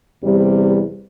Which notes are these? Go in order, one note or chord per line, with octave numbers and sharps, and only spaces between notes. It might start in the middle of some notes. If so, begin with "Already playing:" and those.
E2 C3 G3